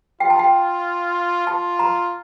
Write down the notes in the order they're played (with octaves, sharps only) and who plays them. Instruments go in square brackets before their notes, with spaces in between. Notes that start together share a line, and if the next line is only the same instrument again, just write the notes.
[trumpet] F4 [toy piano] G5
[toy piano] A5
G5
[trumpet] F4 [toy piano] A5
[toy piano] A#5